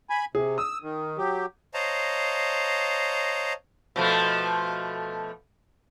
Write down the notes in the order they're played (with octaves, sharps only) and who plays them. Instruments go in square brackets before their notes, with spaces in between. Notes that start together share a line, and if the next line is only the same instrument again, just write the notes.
[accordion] G#5 B5
[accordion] C3 [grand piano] G#4
[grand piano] D#6 [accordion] E6
[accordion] D#3
F#3 G4
[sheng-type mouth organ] C5 C#5 D#5 F5 A5 A#5
[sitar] B2 F3 A3